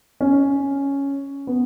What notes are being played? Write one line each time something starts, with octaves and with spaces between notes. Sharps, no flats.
C#4
B3